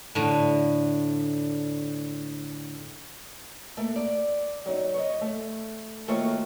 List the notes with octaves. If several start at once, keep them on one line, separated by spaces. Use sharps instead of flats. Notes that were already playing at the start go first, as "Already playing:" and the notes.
A2 D3
A3 A#3
D5
F#3 D#4
C#5 D#5
A3
D#3 A3 A#3 F4 F#4 C#5